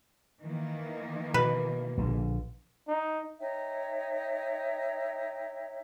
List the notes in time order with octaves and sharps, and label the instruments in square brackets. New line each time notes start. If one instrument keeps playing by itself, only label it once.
[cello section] D#3 E3 A#3
[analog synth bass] B2 [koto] B4
[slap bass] A#1 D3
[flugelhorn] D#4
[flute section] D#4 C#5 E5 G5